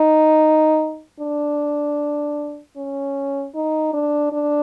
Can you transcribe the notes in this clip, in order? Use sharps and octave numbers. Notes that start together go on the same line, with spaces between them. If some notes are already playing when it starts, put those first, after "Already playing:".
Already playing: D#4
D4
C#4
D#4
D4
D4